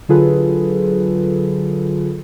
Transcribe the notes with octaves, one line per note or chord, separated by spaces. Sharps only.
D3 F#3 F4 G#4 A4 B4